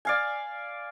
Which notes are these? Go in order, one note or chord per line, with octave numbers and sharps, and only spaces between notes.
D5 F5 G#5